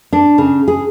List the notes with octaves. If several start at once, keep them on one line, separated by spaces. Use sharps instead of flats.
D4
C#3
G#4